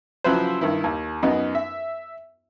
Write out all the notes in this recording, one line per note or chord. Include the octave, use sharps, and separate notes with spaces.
C#3 F3 F#3 E4 B4 C5
G2 D#3 E4
D#2
F#2 B3 D#4
E5